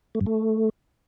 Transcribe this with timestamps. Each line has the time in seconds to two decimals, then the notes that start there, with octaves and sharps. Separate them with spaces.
0.15 A3
0.21 G2
0.26 A3